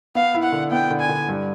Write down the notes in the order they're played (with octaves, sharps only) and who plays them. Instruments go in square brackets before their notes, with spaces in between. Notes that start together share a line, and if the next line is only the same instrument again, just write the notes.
[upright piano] B3 [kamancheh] F5
[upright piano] E4
[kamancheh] F#5
[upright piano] D3
[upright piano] B3 [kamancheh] G5
[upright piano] D3
[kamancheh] G#5
[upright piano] D3
G2